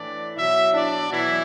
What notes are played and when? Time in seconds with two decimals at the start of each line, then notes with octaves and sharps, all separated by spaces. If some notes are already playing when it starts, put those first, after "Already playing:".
Already playing: A2 E3 D4 D5
0.37 B2 F#3 E4 E5
0.74 D4 D5
1.11 B2 E3 F#3 E4